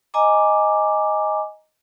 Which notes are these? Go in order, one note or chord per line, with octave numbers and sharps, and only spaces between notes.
D#5 G#5 A#5 D6